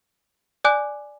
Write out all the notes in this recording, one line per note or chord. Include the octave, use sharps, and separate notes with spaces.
D5 G#5 D6 F#6